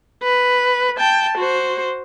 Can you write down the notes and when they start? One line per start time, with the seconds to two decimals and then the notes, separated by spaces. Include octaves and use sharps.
0.23 B4
0.97 G5 A5
1.38 F#4 C5